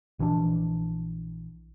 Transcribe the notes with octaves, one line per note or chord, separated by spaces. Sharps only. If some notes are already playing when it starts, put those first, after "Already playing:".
A#1 E3 C#4 D4